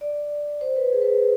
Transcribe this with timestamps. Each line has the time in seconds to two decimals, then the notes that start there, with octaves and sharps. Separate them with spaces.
0.01 D5
0.61 C5
0.76 B4
0.92 G#4
1.02 B4
1.07 G#4